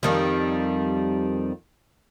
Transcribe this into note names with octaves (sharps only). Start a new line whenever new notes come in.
F2 D#3 G3